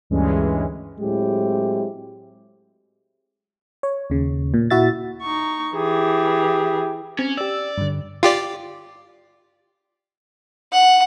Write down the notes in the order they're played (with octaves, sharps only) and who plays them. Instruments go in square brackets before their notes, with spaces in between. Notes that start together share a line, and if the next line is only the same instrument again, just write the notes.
[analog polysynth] D2 G2 E3 G#3 C#4
[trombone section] A2 F#3 G#3 C4 E4 G4
[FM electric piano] C#5
D#2 C#3
A#2
A#2 E4 F#4 E5 A6
[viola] D#4 C#6
[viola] E3 G#4 [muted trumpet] G4
[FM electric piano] C4 [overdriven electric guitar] C#4
[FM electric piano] G4 E6 [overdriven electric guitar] D5
[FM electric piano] G2 D3
[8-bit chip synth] F4 G4 D5
[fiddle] F#5